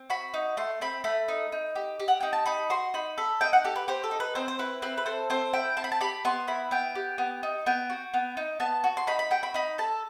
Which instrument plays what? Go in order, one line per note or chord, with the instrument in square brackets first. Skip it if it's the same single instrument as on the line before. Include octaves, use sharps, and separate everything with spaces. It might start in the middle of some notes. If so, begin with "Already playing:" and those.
Already playing: [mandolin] C4
F#4 B5
D#4
A3 C6
C4 B5
A3 B5
D#4
D#4
G4
G4
F#5
D#4 G5
A5
D#4 B5
F#4 C6
D#4 B5
A4 B5
D#4 G5
F#5
G4 A4
B4
G4 C5
A4
D#4
B4
C4 C5
C5
E4 B4
C4 B4
B4
A4 C5
C4 C5
E4 G5
C4 A5
B5
A5
G4 B5
B3 C6
E4 B5
B3 G5
G4
B3
D#4
B3 G5
F#4
B3
D#4
B3 A5
F#4
C6
D#4 B5
B5
F#4 G5
B5
D#4 B5
A4 A5